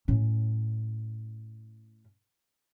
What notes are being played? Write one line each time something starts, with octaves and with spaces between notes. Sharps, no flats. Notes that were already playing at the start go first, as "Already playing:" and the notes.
A2 C#4